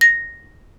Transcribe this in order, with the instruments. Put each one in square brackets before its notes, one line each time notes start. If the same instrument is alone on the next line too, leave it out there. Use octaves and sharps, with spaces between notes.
[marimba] A#6